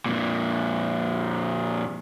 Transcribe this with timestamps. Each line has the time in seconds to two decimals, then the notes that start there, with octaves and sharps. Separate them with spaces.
0.06 F2 A#2